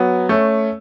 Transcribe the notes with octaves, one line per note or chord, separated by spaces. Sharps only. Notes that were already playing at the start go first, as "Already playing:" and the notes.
Already playing: F#3 B3
A3 C#4